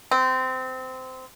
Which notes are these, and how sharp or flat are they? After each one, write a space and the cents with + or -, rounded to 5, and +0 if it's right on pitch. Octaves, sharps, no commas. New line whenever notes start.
C4 -20